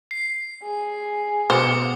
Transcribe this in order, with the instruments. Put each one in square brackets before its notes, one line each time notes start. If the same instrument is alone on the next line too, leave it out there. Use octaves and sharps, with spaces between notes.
[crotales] C7
[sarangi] G#4
[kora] B2 [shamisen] C5 [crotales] D6 D#6 C#7